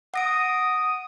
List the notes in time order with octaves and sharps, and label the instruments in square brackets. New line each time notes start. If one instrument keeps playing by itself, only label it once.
[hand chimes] F#5 A#6 D7 [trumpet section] D#6